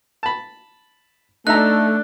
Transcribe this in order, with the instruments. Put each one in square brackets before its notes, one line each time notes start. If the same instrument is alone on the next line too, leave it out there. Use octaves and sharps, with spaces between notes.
[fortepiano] A5 B5
[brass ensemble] A3 [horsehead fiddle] D4 A4 [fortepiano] D#4 E5 A#5 [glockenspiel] F#6